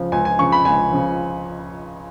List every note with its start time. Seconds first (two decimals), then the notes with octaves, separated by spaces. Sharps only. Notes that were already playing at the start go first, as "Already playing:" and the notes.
Already playing: C#2 C#3 F3
0.12 C#2 G#5
0.25 G#5
0.39 C#3 F3 C#6
0.52 B5
0.65 C#2 G#5
0.92 C#3 F3